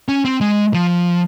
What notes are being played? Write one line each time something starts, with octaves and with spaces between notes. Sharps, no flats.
C#4
C4
G#3
F3